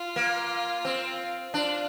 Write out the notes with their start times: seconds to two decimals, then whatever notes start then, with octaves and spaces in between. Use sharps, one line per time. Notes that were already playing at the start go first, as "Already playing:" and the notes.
Already playing: F4
0.16 A#3
0.85 C4
1.54 D4 F4